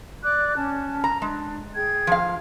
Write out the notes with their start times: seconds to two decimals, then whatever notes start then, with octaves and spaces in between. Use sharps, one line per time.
0.23 D5 D6 F#6
0.56 C#4 A5
1.04 A#5
1.22 G#3 D4
1.76 G#4 G5 G#6
2.07 F3 F5